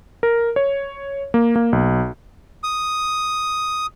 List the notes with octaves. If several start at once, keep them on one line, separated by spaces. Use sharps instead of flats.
A#4
C#5
A#3
A#3
B1
D#6